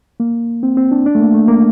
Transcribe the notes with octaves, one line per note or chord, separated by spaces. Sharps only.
A#3
C4
C4
D4
D4
A3
A#3
A3
A#3